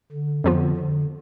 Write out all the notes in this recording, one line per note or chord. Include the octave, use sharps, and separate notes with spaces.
D3
F2 D3 F3 B3 F4
D3